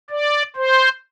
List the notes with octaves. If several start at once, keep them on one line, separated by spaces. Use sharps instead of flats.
D5
C5